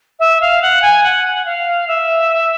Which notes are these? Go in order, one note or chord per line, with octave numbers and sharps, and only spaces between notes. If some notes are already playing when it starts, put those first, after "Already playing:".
E5
F5
F#5
G#5
F#5
F5
E5